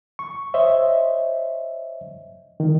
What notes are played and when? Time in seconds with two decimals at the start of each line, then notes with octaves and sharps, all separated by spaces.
0.19 C#6
0.54 C5 C#5 D#5 E5
2.60 D#3